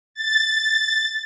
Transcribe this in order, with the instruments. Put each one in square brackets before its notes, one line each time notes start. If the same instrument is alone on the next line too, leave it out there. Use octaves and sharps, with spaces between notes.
[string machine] A6